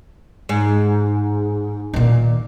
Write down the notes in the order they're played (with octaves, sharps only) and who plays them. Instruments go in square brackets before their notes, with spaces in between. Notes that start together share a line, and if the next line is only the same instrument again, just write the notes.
[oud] G#2
[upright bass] A#2 D#3